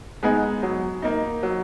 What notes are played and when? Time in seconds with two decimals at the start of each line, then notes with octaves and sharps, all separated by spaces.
0.23 G#3 B3 D#4 G#4
0.63 F#3
1.02 A#3 D#4
1.43 F#3